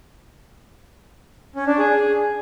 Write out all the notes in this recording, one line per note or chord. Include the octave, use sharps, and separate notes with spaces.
C#4
D4
G#4